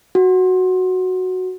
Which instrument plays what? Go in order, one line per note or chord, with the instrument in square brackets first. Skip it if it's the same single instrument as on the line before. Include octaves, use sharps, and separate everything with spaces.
[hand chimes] F#4